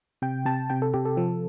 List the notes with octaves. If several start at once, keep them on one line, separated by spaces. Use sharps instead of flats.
C3 G5
C3 A5
C3 G5
A4
C3 G4
A4
F3